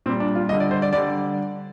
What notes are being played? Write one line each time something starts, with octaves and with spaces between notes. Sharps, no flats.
A#2 G3 C4
D4
F4
D3 G3 D#5
D5
C5
D5
D3 G3 D5